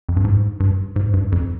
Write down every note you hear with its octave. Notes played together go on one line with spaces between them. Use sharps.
F2
G2
G#2
G2
G#2
G2
F2